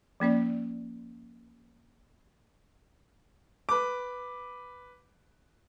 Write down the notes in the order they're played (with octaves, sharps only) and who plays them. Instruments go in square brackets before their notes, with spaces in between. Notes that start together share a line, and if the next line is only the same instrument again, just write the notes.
[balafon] F3 A#3 C#4 D5
[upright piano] B4 D6